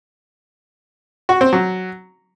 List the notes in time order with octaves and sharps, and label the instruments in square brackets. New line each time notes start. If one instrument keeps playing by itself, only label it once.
[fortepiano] F#4
C4
F#3